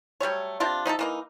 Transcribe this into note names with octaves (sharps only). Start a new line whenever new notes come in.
F#3 G3 A3 C#5
C3 D4 F4
F3 D#4 F#4 A4
E3 A#3 D#4